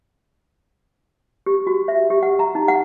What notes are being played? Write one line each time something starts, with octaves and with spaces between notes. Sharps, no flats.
G4
F#4
E5
G4
F#5
A#5
D#4
F#5